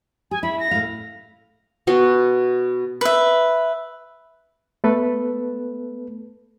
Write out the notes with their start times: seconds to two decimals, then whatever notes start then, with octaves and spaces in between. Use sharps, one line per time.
0.31 G#4 G#5
0.43 E4 B5
0.60 A#6
0.71 A2 F5
1.87 B2 B3 F#4 C6
3.01 B4 E5
4.84 A3 B3 A4 B4